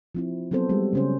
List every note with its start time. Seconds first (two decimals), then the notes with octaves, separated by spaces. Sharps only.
0.15 F3 C4 E4
0.51 F#3 B3 C4 A4 C5
0.69 G3 G#3 F#4
0.93 C#3 C#4 C5